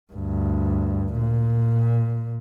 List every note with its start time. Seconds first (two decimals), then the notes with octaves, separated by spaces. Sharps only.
0.12 D2 G2
1.12 A#2